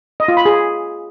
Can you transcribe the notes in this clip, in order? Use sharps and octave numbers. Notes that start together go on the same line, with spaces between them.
D#5
F4
B5
G#4